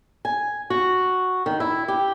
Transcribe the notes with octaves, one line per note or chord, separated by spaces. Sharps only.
G#5
F#4
D#3
E4
G4